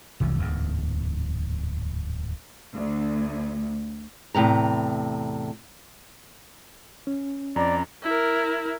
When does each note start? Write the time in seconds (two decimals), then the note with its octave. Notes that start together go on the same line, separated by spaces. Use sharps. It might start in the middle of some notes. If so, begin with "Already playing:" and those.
0.20 F1 C2 E3 F3
0.38 D1 E2 G#2
2.74 D2
4.34 E2 A2 C3 A#5
7.07 C#4
7.56 F2 D5 A#5
8.03 E4 A#4